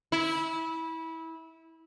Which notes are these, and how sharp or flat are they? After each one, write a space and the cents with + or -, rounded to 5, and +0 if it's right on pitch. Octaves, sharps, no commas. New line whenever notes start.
E4 -20